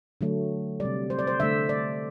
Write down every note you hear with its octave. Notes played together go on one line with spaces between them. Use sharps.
D3 F#3 A3
C3 G3 D5
C5
D5
C5
D3 A3 E5
D5